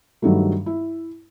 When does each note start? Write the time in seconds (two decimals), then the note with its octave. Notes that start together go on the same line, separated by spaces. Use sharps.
0.22 G2 D#3 F#3 G3 A3
0.66 E4